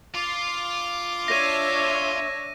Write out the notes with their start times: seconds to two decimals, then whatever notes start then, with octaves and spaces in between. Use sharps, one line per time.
0.15 F4 D6
1.28 D4 C#5 E5 A#6 D#7